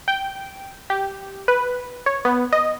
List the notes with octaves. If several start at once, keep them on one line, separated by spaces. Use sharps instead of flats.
G5
G4
B4
C#5
B3
D#5